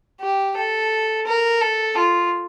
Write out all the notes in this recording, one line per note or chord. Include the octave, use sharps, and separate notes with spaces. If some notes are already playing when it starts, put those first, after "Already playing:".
G4
A4
A#4
A4
F4